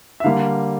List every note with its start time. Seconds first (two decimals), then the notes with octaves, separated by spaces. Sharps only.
0.20 E5
0.24 D3 G3 A#3 F5